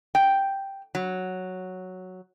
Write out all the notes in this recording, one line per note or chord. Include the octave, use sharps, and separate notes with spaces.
G5
F#3